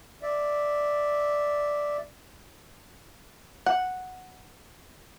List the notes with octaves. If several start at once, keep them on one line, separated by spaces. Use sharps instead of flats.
D5 E5
F#5